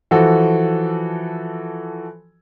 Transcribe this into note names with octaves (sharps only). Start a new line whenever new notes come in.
E3 F3 F#4 A4